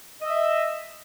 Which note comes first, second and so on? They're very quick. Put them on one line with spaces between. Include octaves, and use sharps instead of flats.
D#5 E6 E5